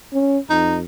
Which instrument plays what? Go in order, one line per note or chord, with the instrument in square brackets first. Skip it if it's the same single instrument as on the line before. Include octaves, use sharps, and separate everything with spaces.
[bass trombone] C#4
[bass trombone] F2 [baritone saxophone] D#4